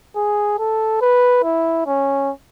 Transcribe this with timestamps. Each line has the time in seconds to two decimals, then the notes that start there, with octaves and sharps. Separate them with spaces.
0.16 G#4
0.59 A4
1.01 B4
1.44 E4
1.86 C#4